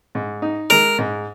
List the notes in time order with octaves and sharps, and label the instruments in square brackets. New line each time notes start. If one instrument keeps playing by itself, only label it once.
[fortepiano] G#2
D#4
[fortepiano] G#3 [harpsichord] A#4
[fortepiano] G#2